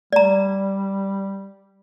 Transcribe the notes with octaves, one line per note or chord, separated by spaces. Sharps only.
G3 D5 A#5